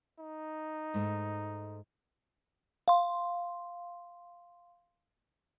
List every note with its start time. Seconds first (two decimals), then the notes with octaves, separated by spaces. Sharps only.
0.20 D#4
0.94 G#2 A3
2.88 F5 C6